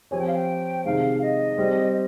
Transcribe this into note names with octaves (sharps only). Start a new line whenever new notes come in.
F3 C4 G4 C#5 G#5
G5
F5
G5
C3 D#3 G#3 F5
D#5
G3 C4 G4